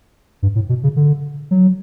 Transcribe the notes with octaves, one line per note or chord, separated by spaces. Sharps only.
G2
A2
B2
C#3
D3
F#3